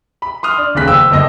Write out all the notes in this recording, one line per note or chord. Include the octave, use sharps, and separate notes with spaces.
B5
C6 D#6 F6
D4
F1 D#2 C#3 F#6 B6
C5 G5 E6
F#1 D3 A#3 D#5 A#6